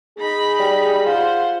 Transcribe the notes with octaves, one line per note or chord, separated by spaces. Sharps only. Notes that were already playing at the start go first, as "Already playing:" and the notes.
D#4 G#4 B5
G3
F4 C5 F#5